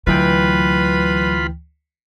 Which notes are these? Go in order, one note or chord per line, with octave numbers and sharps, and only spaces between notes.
D2 E3 F#3 F4 B4 G5 B5